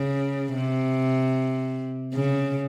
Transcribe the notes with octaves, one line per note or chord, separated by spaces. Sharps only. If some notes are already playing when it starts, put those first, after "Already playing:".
Already playing: C#3
C3
C#3